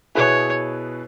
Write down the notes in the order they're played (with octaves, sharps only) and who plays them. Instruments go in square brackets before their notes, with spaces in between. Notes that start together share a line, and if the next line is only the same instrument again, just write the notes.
[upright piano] B2 B3 E4 G#4 B4 [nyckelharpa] C#5